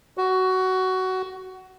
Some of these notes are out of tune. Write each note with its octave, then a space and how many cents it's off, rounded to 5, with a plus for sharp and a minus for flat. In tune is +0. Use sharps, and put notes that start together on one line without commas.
F#4 +15